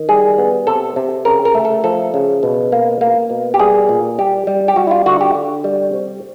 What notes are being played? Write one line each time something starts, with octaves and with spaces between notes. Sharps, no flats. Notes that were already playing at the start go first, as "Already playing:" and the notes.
Already playing: D#3
G3 G#4
B3
C3 A4
C3
C#3 A#4
A#4
A3
A4
F3 A4
C#3
B2
A#3
A#3
B2
G4
G3 G#4
A#2
G3 G4
G3
G4
G3 F#4
E4
F4
D3 F#4
G4
D3
G3
C3